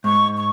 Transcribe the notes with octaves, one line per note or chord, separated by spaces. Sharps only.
G#2 C#6
C#6